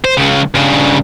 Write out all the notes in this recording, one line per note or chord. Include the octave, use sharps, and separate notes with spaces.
C5
C#2 C#3
G2 C#3